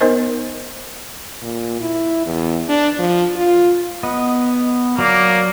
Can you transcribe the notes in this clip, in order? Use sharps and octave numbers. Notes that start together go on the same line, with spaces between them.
B3 D#4 A#4 C5 D#5
A#2
E4
E2
D4
F3
F4
B3 D#5
F#3 A#3 D5